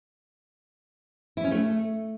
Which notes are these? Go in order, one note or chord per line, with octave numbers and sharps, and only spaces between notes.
E4
C#4
A3